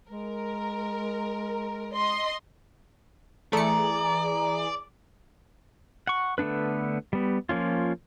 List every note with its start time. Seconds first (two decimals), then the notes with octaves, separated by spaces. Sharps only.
0.10 G#3 A#4
1.94 D#5 C6
3.53 E3 A3 G#4 D5 A#5 C#7
6.07 F#5 C#6
6.38 D3 A3 B3 D4 B4
7.13 G3 B3
7.49 F3 A#3 C#4 F4